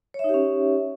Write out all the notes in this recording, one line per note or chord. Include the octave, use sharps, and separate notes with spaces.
C#4 D#4 G4 C#5 E5